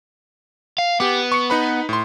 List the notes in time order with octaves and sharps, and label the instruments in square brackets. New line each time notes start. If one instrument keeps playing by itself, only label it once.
[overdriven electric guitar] F5
[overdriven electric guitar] B3 [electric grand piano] G4 D6
[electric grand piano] C#6 C#7
D#4 B4 B5
A2 C6